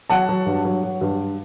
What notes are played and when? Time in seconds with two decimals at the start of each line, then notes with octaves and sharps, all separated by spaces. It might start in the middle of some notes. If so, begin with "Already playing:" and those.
0.10 F#3 F#5 A5
0.29 F#3
0.46 G2
0.65 F#3
0.83 F#3
1.01 G2